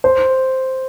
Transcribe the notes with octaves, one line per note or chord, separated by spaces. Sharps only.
C5